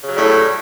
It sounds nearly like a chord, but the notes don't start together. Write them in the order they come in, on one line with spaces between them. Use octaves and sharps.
C#3 F#3 G3 A2